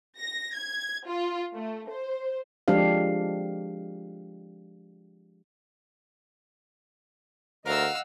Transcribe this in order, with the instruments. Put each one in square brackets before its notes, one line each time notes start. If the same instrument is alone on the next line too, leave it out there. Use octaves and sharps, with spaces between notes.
[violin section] A#6
G#6
F4
A3
C5
[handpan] F3 G#3 D4 G4 F5
[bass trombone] D2 [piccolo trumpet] A#4 [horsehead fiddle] D#5 F#5 [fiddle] F5 E6